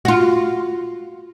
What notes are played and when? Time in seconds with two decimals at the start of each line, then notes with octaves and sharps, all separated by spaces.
0.05 F4 F#4